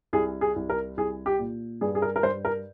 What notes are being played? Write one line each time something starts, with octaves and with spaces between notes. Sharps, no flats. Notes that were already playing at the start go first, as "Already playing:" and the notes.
C2 G#4
G#4
C2
A#4
C2 G#4
G4
A#2
G2 G#4
G#4
A#4
A#4
G2 C5
A#4